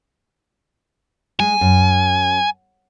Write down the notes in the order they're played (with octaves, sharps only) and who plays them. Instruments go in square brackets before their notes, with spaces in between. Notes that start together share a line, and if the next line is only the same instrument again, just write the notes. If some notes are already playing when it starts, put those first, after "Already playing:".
[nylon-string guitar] G#3 [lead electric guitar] G#5
[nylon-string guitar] F#2